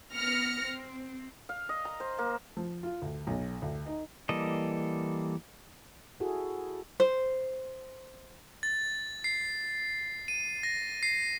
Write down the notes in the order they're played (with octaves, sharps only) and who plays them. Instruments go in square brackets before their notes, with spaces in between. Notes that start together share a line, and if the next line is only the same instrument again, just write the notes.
[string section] B3 F6 A#6 C#7
C4
[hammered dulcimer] F5
D#5
A#5
C5
A#3
[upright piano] F3
F4
D2
B1
D2
D#4
[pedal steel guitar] E3 G3 A#3 A4 D#5
[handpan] E4 F#4 G#4 A4
[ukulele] C5
[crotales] A6
C7
D#7
A#6
C7